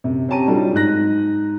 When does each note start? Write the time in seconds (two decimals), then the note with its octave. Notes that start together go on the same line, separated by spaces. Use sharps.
0.04 F#2 C3
0.29 C4 C#4 G4 A5 A#5 D#7
0.48 F#3 G3 D4 D#4 F4 A4
0.73 G#2 D#4 A#5 F#6 A#6